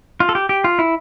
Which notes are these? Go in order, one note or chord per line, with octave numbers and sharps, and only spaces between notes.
F4
A4
G4
G4
F4
E4